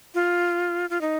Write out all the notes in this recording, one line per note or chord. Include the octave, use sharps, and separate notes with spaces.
F4
F4
D#4